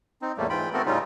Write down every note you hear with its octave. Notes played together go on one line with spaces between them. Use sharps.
C4 D#4
E2 A2 G3 A3 A#3
G#2 E3 F4 G5 B5
A3 B3 C4 F#4 A4 A#4
A2 C#3 G3 C#4 D#4 F4